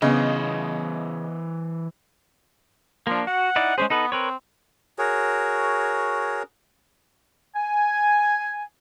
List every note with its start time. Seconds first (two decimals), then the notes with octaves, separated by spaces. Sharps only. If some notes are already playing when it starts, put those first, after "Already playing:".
0.02 C#3 E3 B3 C5 D#5
3.07 F3 A#3 D4
3.27 F#4 F#5
3.56 D#4 E4 D5
3.78 G#3 C#4 G#4 C5
3.90 B3 D#4 A4 B4
4.12 C4 A#4 B4 C#5
4.98 F#4 G#4 A#4 C#5
7.56 G#5